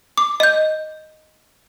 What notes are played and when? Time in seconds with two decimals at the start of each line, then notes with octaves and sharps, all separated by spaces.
0.18 D6
0.40 D#5 G6